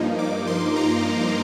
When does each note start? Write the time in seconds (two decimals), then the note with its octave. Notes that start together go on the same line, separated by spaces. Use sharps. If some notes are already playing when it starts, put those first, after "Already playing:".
Already playing: G2 F3 A#3 D#4
0.19 D6
0.47 C6
0.76 A#5